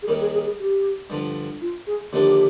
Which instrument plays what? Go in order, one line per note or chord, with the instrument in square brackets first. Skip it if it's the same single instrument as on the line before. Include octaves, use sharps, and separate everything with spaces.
[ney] G#4
[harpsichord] D#2 D#3 G3 [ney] A#4
[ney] G#4
G#4
G#4
G4
[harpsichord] G2 D3 F3
[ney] F4
G#4
[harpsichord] D#2 D3 F3 A#3 D4 [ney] G4